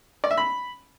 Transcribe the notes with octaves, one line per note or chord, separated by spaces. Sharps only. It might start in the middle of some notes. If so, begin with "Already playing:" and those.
D5
E5
B5